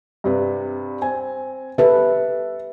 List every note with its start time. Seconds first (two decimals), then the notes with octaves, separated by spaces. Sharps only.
0.24 G2 C3 B4
1.02 C4 G#5
1.78 G4 A4 B4 E5